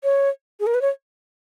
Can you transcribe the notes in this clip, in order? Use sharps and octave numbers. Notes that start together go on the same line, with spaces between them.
C#5
G#4
A#4
B4
C#5